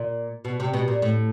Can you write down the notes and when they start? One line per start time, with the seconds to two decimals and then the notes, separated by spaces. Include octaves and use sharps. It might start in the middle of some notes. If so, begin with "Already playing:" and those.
Already playing: A#2
0.45 B2
0.60 C3
0.73 B2
0.88 A#2
1.02 A2